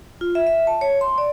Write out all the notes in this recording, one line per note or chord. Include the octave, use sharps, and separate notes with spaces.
F4
E5
E5
A5
C#5
C6
D5